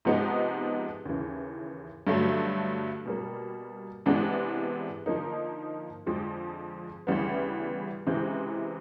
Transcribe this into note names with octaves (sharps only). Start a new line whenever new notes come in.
C3 F3 G#3 B3 D#4
D#2 C#3 E3
G2 D3 F#3 A3
B2 G3 A#3
C3 E3 G#3 B3 D4
D3 F3 A#3 D#4
F2 D3 F3 G#3
D2 C#3 E3 G3 B3
C#2 C3 E3 G#3 C4